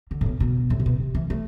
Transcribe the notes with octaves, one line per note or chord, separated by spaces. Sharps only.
D3
A2
B2
B2
A2
C3
B2
C3
E3
A3